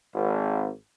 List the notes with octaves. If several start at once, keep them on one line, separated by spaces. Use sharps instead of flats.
G#1